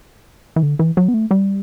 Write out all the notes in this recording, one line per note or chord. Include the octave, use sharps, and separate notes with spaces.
E3
D3
E3
F#3
B3
A3
G3